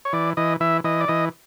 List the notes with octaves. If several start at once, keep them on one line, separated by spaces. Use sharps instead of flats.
C#5
E3 D5
E3 D#5
E3 E5
E3 D#5
D5
E3 D#5